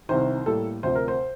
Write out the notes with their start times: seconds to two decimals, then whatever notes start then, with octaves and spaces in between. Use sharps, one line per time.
0.09 C2 C3 D#3 C5
0.46 A2 G3 A#3 A4
0.83 D2 C3 F3 C5
0.95 A#4
1.08 C5